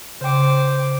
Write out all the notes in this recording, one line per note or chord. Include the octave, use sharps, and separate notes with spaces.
C#3 C5 G5 D6